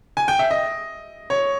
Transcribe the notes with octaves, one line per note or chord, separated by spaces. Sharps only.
G#5
G5
E5
D#5
C#5